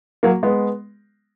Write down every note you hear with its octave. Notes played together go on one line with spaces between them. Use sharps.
F#3 A#3
G#3 B3